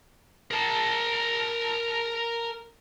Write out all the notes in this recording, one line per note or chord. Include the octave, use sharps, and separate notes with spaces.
A#4 A5